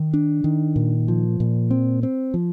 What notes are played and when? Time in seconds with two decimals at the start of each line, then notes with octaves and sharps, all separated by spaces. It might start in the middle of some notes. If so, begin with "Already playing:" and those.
Already playing: D#3
0.14 D4
0.44 D#3
0.76 A#2
1.08 F3
1.40 A#2
1.71 C4
2.03 C4
2.34 F3